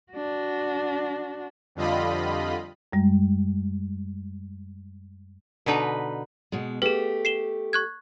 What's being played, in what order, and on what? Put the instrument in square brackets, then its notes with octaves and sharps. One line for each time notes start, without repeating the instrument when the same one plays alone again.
[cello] D4 F#4
[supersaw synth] F2 D3 G3 F4 D#5 B5
[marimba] F#2 G3 G#3
[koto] B2 D3 D#4 B4
[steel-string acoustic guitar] B2 G#3
[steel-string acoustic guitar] A3 G4 [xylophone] G#4 B4
[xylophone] C7 E7 G7
C#6 F#6 G#6